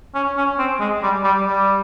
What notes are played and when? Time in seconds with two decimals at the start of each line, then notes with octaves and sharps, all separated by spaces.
0.15 C#4
0.37 C#4
0.59 C4
0.80 G#3
1.03 G3
1.24 G3
1.46 G3